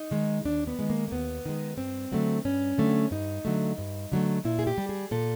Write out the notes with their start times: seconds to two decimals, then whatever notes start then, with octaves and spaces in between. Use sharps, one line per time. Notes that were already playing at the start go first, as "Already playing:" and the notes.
Already playing: D#4
0.11 D#3 G#3
0.45 D#2 D4
0.67 B3
0.79 D#3 G#3
0.90 A#3
1.08 A#3
1.12 D#2 B3
1.45 D#3 G#3
1.78 G2 C4
2.11 D3 F#3 A3
2.45 G2 C#4
2.78 D3 F#3 A3
3.11 G2 D#4
3.45 D3 F#3 A3
3.78 G2
4.12 D3 F#3 A3
4.45 A#2 E4
4.59 G#4
4.67 G4
4.78 G3
4.89 G#4
5.11 A#2 A4